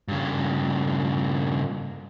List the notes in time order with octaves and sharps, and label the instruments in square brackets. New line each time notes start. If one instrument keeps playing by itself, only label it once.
[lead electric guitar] G2 C#3